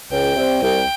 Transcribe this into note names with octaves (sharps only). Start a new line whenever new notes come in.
C#2 G5
C3 G3 C4
C2 G5